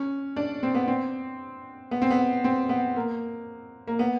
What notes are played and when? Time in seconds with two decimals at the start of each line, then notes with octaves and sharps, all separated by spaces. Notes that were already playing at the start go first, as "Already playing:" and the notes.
Already playing: C#4
0.36 D4
0.63 C4
0.75 B3
0.88 C4
1.91 B3
2.02 C4
2.11 B3
2.44 C4
2.69 B3
2.96 A#3
3.88 A#3
3.99 B3